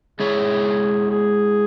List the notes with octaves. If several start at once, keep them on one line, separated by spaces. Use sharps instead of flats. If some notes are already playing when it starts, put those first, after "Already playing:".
G#3 E4 G#4 C#5 E5
G#4